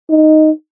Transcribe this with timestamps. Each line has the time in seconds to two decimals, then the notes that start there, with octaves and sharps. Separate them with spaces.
0.10 D#4